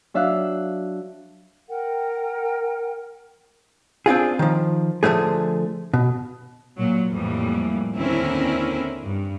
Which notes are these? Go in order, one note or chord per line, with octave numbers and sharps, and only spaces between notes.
F#3 D4 E5 F5 F#6
A#4 F#5 G5
C4 D4 F4 G#4
D#3 F3
D3 E3 F3 A3 G#4
B2
A#2 F#3
F2 A2 E3 G3 A#3
D#2 D3 C4 C#4 E4 A#4
G2